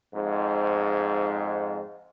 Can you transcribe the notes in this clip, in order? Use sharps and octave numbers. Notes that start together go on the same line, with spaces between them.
F2 G#2